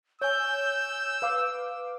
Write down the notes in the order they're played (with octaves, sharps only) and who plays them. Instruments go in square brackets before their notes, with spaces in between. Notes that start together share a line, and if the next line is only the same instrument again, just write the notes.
[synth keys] C#5 G#5 [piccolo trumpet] E6 [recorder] G6
[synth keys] B4 F5 D6